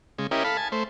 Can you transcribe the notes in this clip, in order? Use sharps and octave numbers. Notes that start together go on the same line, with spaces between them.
C#3 G#3
C#4 E4 G4 A#4 D#5
A4 F5 B5
G#5 A5
A3 C5